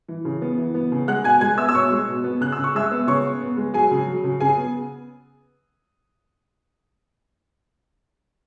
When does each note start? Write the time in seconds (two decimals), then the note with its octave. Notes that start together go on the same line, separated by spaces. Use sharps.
0.09 E3
0.25 C#3
0.42 B3
0.58 E3
0.74 B3
0.92 C#3
1.08 G#3 F#5 F#6
1.24 B2 G#5 G#6
1.41 G#3 G#5 G#6
1.58 B3 E5 E6
1.69 E6
1.74 B2 C#5 C#6
1.91 G#3
2.08 B2
2.24 B3
2.41 C#3 F#6
2.52 E6
2.58 C#3
2.64 C#6
2.75 G#3 E5 E6
2.91 B3
3.07 C#3 C#5 C#6
3.24 B3
3.40 B3
3.57 G#3
3.74 F#3 G#4 G#5
3.91 C#3
4.08 F#3
4.24 C#3
4.40 C#3 G#4 G#5
4.57 B3